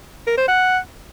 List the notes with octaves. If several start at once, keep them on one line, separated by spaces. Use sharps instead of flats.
A#4
C5
F#5